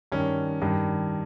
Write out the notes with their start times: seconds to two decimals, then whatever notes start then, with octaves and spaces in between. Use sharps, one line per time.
0.12 G2 D#3 C#4
0.62 G2 D#3